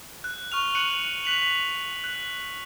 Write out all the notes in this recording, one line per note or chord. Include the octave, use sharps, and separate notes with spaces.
F#6
C#6 F6 F7
F#6 C#7 D#7 F7 F#7
F#6 B6 F7 F#7
F#6